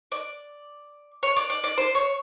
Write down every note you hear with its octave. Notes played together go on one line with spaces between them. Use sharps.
D5
C#5
D5
D5
D5
C5
C#5